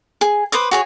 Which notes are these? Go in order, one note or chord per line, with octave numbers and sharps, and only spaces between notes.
G#4
B4 C5 D6 D#6
F#4 G#4 C#5